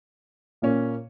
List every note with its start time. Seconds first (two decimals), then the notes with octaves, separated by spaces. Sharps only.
0.62 A#2 A#3 C#4